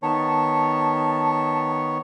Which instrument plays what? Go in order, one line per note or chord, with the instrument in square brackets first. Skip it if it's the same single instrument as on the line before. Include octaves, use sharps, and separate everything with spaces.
[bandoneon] D#3 B3 C#5 [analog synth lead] A5